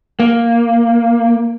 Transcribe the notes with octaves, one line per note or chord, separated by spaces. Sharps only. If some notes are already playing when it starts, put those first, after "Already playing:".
A#3